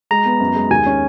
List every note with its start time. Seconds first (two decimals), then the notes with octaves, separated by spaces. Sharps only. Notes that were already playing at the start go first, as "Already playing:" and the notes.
0.11 G#3 A#5
0.25 B3
0.40 F#2
0.55 G#3
0.70 D#2 G#5
0.86 C#4